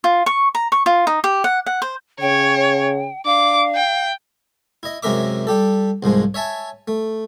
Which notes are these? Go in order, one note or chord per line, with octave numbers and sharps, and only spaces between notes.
F4
C#6
A#5
C#6
F4
D#4
G4
F#5
F#5
C5
C#3 C#5 G5
D4 F5 D6
G5
E4 D#5
F#2 C3 G#3 A#4 E5 D6
G3 G4 A4
C2 G#2 F3 G#3
C#5 E5 G#5 A5
A3